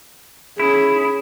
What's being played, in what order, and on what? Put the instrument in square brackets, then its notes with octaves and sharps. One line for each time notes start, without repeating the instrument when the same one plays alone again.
[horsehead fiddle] C#4 G#4 [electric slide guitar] E4